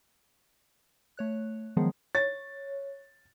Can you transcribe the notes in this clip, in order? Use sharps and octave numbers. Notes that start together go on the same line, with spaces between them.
A3 C#5 F#6
D#3 F3 F#3 G#3 B3 G#4
C#5 A6